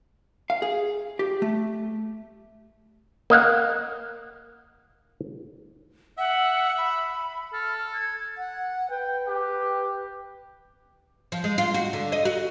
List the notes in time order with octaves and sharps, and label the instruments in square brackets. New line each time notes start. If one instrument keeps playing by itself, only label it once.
[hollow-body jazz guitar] F5
G#4
G4
A3
[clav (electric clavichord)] A#3 D#5 F5 F#5
[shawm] E5 [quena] F#5
[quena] B5
[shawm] A4 [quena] F6
[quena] G#6
[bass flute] F#5
[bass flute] B4 [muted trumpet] G5
[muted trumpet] G4
[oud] F3
G#3
F4
F#4
D3
D#5
F#4